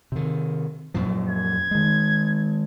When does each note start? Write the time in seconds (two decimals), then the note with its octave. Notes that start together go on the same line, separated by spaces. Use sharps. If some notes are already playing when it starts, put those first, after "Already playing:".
0.12 C3 D#3
0.94 F#2 A#2 F3
1.29 G#6
1.71 D#3 G#3